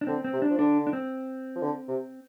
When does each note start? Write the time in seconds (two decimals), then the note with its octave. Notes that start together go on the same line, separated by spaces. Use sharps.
0.01 D4
0.07 D3 C4
0.24 C4
0.33 C3
0.42 D4
0.50 F3
0.59 D3 D4
0.87 D4
0.93 C4
1.56 F3
1.63 D3
1.88 C3